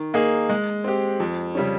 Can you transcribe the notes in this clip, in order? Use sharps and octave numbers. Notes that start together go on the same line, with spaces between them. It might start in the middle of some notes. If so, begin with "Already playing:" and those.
Already playing: D#3
A#3 D#4 G#4
G#3
C4 G4
F2
C#3 G3 C#4